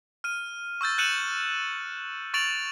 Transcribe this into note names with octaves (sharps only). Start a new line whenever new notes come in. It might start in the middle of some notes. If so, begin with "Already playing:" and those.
F6 D#7
C#6 E6 G6 A6
F#6 G6 C#7 D#7 E7 F#7
C#6 A6 D7 F7 F#7